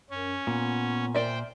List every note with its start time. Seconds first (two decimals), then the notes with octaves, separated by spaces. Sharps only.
0.10 F#2 C#4
0.47 A#2 B3
1.15 A#4 C5 D5 E5 G5